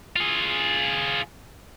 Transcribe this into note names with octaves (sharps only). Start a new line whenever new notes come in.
F4 G#4